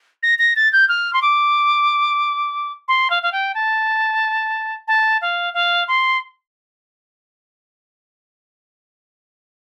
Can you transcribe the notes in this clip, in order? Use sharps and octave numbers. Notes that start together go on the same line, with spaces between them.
A#6
A#6
A6
G6
F6
C6
D6
C6
F5
F5
G5
A5
A5
F5
F5
C6